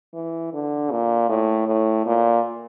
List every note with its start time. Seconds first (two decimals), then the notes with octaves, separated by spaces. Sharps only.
0.14 E3
0.53 D3
0.91 A#2
1.29 A2
1.67 A2
2.06 A#2